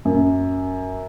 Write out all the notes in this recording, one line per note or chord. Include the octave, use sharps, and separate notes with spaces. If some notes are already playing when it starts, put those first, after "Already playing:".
F#2